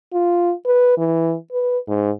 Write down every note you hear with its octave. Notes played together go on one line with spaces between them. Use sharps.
F4
B4
E3
B4
G#2